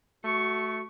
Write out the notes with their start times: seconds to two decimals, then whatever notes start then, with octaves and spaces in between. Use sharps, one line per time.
0.24 A3 F#4 C#6